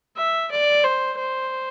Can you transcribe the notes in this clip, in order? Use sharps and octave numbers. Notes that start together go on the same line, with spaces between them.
E5
D5
C5
C5